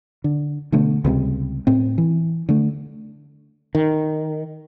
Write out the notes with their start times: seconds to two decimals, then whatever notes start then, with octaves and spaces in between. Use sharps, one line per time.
0.24 D3
0.72 B2 D3 A3
1.05 C#2 C3 F#3 G3
1.67 A2 C4
1.98 E3
2.49 D3 A3
3.75 D#3